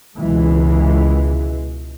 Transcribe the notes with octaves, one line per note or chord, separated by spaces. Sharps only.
C#2 B2 E3 G#3